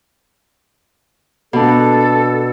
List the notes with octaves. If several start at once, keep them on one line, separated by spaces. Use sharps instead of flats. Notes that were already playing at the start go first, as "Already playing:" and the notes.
B2 D4 A4